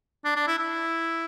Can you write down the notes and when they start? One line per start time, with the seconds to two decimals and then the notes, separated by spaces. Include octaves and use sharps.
0.25 D4
0.36 D4
0.47 E4
0.58 E4